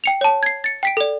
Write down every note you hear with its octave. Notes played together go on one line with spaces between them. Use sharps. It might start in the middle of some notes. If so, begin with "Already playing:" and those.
G5 C#7 F7
C#5 A5
G#6 C7
A6 C#7
G5 B6 D7
A4 D5